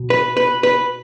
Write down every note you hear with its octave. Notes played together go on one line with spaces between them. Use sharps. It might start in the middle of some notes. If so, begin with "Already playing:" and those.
Already playing: B2
B4
B4
B4